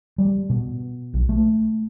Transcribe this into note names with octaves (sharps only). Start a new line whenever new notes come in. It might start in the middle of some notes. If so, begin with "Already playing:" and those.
G3
B2
B1
A3